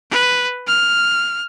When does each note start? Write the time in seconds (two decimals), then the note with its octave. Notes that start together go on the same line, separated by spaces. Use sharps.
0.11 B4
0.68 F6